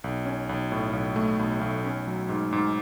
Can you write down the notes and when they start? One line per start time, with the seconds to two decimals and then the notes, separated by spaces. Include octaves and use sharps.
0.04 B1
0.26 C#4
0.49 B1
0.72 A2
0.93 B1
1.16 A3
1.39 B1
1.61 B1
1.85 C#4
2.07 F#3
2.29 G#2
2.53 G#2